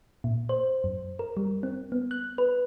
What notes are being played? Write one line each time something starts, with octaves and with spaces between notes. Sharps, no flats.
A#2
C5
F#2
A#4
G3
C4
B3
F#6
B4